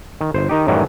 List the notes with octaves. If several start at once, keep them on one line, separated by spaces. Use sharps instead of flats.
D#3
G1 C5
D#3 D#4 G4
F#2 A2 D#3 E3 F#3 G3